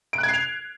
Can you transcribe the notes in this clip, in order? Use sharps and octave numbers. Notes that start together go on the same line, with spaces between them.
D7
F#6
G#6
C7
F7